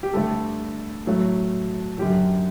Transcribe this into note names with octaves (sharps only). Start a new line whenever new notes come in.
G4
G2 D3 A3 A4
A2 F#3 A3
F#2 D3 F#3 G4